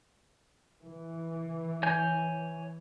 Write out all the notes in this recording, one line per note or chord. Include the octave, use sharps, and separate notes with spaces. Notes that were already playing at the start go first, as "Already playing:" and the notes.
E3
C#5 G#5 G6